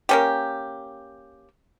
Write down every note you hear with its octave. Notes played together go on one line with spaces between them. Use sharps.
A#3 C#4 G4